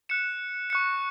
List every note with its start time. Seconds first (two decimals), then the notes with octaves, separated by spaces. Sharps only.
0.09 F#6 C#7 E7
0.70 C#6 F#6 C#7